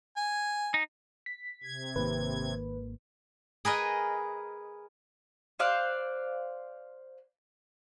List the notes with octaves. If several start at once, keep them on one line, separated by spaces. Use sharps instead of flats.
G#5
D#4
B6
C3 G#6
G#1 D#3 A#3 B4
G#4 A#4 B4 D#5
C5 D5 F5 F#6